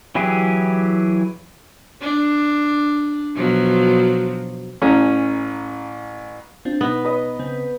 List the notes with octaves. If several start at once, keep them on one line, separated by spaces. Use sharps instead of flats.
E3 F#3 E4 G4 G#4
D4
B2 F3 F#3
A1 C#4 A#5
C4 D4 F4
B2 B3 D#4
B4 D#5
C#3 C4